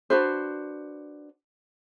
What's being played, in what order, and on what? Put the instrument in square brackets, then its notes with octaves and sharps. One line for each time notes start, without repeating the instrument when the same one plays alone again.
[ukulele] D4 F#4 B4 C5